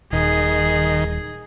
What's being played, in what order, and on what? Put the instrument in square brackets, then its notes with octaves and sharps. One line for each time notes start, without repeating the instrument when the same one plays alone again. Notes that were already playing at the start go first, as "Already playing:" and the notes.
[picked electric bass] D#1 [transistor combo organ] D#3 [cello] G#4